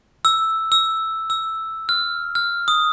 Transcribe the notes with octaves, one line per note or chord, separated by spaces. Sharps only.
E6
E6
E6
F6
F6
D#6